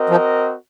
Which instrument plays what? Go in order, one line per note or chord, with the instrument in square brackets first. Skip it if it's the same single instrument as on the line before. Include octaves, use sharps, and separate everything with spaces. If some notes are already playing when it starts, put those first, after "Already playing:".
Already playing: [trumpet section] C4 F#4 A#4 D#5
[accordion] F3